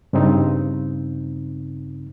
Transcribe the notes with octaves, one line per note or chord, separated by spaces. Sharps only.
G2 C#3 C4 D#4